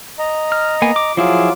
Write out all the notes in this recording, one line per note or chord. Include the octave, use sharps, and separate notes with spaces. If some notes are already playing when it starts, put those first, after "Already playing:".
D#5 A#5
F6
A#3 B3 G#5
D6
F3 F#3 E4 F4 G#4 D6